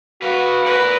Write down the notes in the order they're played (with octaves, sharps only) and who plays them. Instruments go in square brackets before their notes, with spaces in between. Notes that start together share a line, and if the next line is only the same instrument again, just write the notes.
[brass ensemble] F#4 [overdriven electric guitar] B4 F5
[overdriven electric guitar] A#4 D5 [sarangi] B4